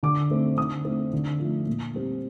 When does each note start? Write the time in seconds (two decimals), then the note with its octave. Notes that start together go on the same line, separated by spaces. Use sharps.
0.03 D3 D6
0.30 A3 C4
0.58 D3 D#6
0.85 A3 C4
1.13 D3
1.39 F3 A3
1.67 A#2
1.94 G3 C4